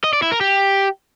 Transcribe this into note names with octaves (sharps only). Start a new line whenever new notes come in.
D#5
D5
E4
A#4
G4